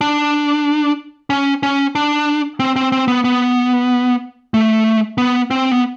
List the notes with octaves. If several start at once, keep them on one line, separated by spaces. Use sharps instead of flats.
D4
C#4
C#4
D4
C4
C4
C4
B3
B3
A3
B3
C4
B3